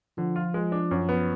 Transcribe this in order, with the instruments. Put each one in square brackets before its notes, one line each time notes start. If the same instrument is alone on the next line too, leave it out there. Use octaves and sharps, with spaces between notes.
[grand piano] D3 [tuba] F3
[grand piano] F4
G#3
D4
F#2
B3